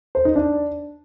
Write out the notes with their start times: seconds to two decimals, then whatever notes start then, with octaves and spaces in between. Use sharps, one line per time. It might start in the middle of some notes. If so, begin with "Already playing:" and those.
0.15 C5
0.25 D#4
0.36 D4